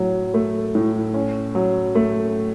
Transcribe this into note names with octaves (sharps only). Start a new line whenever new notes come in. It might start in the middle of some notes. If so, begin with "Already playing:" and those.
Already playing: A2 F#3
A3
A2
C#4
F#3
A3